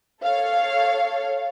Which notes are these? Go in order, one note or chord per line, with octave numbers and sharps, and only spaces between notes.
A4 C#5 F5